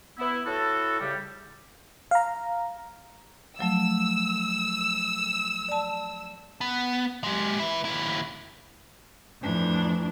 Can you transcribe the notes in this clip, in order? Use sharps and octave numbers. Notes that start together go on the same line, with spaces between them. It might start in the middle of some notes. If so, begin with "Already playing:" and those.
B3 E4
A2 E4 F#4 A4
A2 C#3 G3
F5 A#5
F3 F#3 A3 E6
D5 A5
B3
G#3 G4
E4 B4
D#2 E4
F2 A2 E3 D4